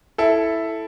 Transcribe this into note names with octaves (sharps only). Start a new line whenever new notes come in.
E4 A4